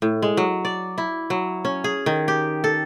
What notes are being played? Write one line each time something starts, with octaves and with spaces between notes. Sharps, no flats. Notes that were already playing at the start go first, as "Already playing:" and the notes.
A2
G#3
F#3
D5
E4
F#3
C#4
G#4
D#3
G4
A4